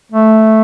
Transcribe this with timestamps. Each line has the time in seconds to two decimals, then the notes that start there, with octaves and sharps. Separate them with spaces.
0.12 A3